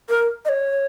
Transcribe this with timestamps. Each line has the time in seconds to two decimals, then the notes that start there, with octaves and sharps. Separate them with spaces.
0.09 A#4
0.45 D#5
0.49 C#5